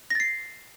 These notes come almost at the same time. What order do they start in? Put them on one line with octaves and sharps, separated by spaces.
A#6 A6 C7